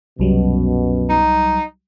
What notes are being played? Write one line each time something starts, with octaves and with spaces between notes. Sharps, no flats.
C2 F#2 B2 F#3 G3
D#4